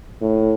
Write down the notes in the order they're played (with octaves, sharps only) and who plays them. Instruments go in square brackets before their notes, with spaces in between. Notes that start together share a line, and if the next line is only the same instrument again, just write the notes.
[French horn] A2